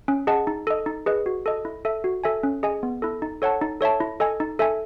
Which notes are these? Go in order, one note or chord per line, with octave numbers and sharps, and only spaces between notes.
C#4
G#4 D#5 F#5 A5
D#4
A4 D#5
D#4
G#4 B4 D#5
F#4
A4 D#5
E4
A4 E5
F#4
A4 E5 G#5
C#4
G#4 D#5 G#5
B3
E4 A4
D#4
A4 C#5 F#5 A5
D#4
A4 C#5 E5 A5
E4
A4 D#5 G#5
D#4
A4 E5 G#5